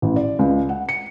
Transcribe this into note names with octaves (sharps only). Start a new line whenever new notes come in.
A1
D5
C#2
F#5
C#7